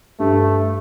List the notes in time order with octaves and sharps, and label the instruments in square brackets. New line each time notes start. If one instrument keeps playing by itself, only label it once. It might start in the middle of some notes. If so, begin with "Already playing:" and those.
[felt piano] G2 [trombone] A3